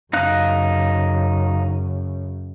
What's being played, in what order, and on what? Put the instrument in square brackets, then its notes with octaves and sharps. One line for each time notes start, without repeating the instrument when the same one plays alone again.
[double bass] F#2 C#3 [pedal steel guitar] D#4 F5 F#6